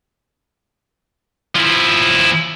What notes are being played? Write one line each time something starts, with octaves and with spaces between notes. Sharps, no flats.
F3 E4